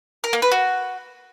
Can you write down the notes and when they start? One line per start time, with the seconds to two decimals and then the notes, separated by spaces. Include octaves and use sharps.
0.24 A#4
0.33 A#3
0.42 B4
0.51 F#4